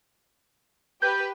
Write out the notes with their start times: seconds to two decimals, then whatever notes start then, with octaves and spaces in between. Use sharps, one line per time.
1.02 G4 B4 G6